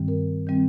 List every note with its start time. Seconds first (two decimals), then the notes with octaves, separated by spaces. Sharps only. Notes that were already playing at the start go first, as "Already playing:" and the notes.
Already playing: G2 D#3 G3 C4
0.08 A#4
0.47 D#3 G3 C4